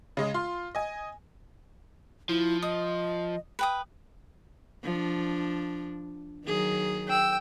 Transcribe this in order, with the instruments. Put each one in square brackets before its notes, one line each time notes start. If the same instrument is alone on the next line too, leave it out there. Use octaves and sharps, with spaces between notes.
[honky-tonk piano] C#3 G#3 D#5
F4 C6
D#5 G#5
[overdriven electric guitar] F3 [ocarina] E4
[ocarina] D#5 [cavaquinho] D#6
[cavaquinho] B4 G5 D#6
[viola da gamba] F3 D4
D#3 F#3 G#4
[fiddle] G5 E6